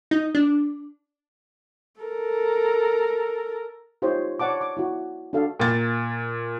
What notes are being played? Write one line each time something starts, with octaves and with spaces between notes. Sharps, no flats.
D#4
D4
A4 A#4
D#4 F4 G4 C5 C#5
C#5 D5 F#5 A5 D6
D6
E4 F#4
D4 F#4 A4 F5
A#2 A6